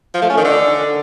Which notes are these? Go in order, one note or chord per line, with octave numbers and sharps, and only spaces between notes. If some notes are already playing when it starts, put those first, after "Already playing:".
F3
A3
C#4
D#3
D3